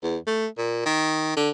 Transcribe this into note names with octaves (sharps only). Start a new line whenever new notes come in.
E2
A3
A#2
D#3
D3